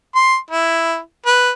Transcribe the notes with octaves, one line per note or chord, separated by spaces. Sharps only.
C6
E4
B4